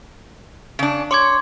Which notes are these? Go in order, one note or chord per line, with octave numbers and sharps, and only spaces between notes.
C#3 D4
C#5 C6 D6 G#6